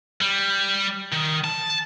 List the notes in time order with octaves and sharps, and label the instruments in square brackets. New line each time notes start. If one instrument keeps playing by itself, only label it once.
[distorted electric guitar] G3
D#3
A5